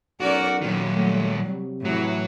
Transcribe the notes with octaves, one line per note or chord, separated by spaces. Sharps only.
B1 C#4 F#4 A#4 D5
A#2 D#3 F#3 G3
A3
C3
A2 E3 F#3